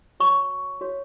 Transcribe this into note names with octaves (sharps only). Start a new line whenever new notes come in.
F#4 C#5 C#6
F#4 C#5